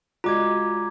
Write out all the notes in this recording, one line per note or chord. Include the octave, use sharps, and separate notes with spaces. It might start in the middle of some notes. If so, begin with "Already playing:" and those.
G#3 F4 F#4 D5 A#5 D6 G#6